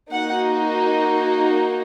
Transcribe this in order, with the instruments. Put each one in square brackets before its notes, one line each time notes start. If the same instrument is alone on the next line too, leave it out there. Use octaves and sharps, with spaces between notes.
[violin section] A#3 D#4 F#4 F#5